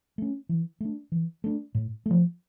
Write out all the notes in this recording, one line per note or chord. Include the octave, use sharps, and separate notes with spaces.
A3 C#4
E3
A3 D4
E3
A3 D4
A2
F3 A3